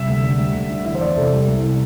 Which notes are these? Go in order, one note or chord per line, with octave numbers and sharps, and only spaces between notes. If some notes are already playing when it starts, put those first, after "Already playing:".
Already playing: C3 G3 E5
D2
D3
G3
D2
D3
E3 E5
C5
E2 D5
C3 A4
G3
C2
C3